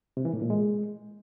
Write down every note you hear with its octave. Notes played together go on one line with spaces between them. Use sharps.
C3
E3
A2
A#2
G#3